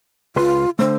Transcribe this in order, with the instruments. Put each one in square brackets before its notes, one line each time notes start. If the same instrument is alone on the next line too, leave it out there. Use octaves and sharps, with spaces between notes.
[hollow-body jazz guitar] C#2 B4 C6 [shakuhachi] F4
[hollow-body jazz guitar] D3 A3 [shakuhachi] C5